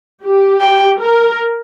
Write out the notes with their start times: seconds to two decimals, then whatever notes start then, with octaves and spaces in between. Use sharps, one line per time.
0.24 G4
0.61 G5
1.00 A#4